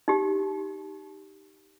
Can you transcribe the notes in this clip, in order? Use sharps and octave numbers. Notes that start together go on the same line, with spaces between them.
D#4 G4